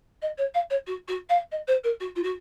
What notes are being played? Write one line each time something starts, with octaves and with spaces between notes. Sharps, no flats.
D#5
C#5
F5
C#5
F#4
F#4
F5
D#5
C5
A#4
F#4
F4
F#4